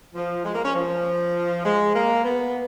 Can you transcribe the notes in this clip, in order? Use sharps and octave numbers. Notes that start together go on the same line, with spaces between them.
F3
G#3
A#3
C#4
F3
G#3
A#3
B3